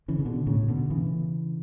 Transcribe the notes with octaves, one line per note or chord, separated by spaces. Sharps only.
C#3 E3
C#3
B2 D3
A2 C#3
B2 D3
C#3 E3